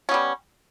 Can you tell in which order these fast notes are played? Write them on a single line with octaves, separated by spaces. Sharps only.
C#4 B3 G3